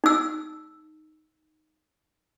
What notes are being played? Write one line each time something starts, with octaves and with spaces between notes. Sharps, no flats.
D#4 E6